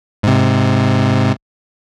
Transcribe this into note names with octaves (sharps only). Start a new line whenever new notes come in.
G#2 C3